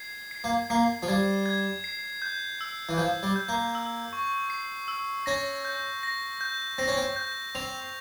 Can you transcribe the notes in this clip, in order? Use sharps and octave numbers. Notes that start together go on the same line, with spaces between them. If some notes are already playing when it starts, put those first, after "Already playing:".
Already playing: G#6 C7
C7
A#3
A#3 C7
F3
G3 G#6
G#6
C7
G6
E6
E3
F3 G6
G3
G6
A#3
E6
C#6
C7
E6
C#4 A#6
G6
A#6
G6
C4 A#6
C#4
C4
G6
C4 F7